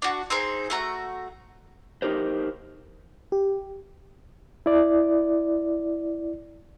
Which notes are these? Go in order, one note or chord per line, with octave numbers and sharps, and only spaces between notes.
D4 F#4
C4 D#4 G#4 C5
A3 F#4 A#5
D#4 G4 A#4 C5
G4
E4 D5